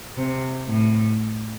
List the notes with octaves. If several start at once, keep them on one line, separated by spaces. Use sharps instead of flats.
C3
A2